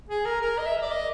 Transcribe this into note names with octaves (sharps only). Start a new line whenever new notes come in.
G#4
A#4
A#4
D#5
E5
D5
D#5